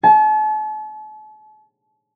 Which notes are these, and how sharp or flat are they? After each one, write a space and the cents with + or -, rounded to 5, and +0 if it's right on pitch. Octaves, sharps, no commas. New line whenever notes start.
A5 -40